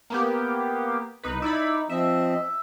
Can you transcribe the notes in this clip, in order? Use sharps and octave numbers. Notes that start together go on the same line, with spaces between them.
A#3 B3 G4
C2 D#4 B4
D#4 E4 D5 B5
F3 C4 D#5 E5